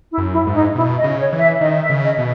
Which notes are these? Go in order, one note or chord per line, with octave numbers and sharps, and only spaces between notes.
E4
F#2
E4
G#2
D#4
B2 E4
D#5
C#3
C#5
E3
E5
D#3 D#5
E5
C#3
D#5
B2